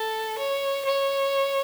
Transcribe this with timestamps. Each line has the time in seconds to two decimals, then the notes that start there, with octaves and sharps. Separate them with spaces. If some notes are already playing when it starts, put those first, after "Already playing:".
Already playing: A4
0.38 C#5
0.85 C#5